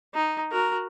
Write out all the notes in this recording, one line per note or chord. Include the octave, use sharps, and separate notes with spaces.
D#4
F#4 A#4